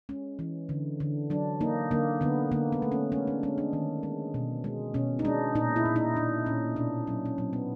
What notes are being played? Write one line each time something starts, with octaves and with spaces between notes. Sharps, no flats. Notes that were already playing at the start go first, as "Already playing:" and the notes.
G#3 C#4
E3
D3
D3
F#3 D4
A#3 D#4
D3 A#3
D3 B3
D3 A#3
B3
A3
C#4
G#3 C#4
D4
G#3 C#4
D4
D#3
G#3
B2
G#3
B2 C#4
D#4
G#3 D4
A#2 D#4
E4
A#2
D#4
A#2 D4
A#2 C#4
B2 D4
F#3 C#4
C#4
F#3 C4
B3